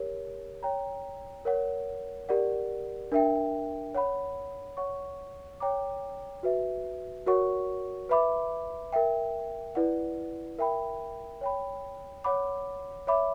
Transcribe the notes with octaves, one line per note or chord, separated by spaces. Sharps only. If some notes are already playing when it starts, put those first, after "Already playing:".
Already playing: G4 A#4 C#5
C#5 G5 A#5
A#4 C#5 F#5
G4 A#4 D5 F#5
D4 A#4 E5 G5
C#5 F#5 B5
C#5 F#5 C#6
C#5 G5 A#5 D6
F#4 B4 E5
F#4 A#4 C#5 F#5 C#6
B4 E5 B5 D6
A#4 E5 G5
E4 B4 D5 F#5
A#4 E5 G5 B5
C#5 G5 B5
C#5 F#5 B5 D6
C#5 E5 B5 D6